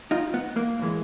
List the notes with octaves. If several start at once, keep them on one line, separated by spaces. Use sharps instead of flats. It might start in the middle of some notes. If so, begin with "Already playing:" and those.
D#4 F4
B3
A#3
A2 E3 G#3